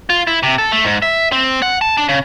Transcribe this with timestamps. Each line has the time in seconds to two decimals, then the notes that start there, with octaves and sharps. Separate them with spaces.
0.10 F4
0.27 E4
0.43 C3
0.58 A4
0.72 A3
0.84 G#2
1.02 E5
1.32 C4
1.62 F#5
1.81 A5
1.97 D4
2.09 C#3